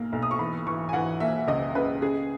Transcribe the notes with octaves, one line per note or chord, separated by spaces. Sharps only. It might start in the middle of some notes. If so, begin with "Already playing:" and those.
Already playing: B1 A#3
B1
D#6
C#6
E3 B5
E3 C#6
G#5
E3 F#5
A#3 E5
C#2 D#5
C#3 B4
C#3 G#4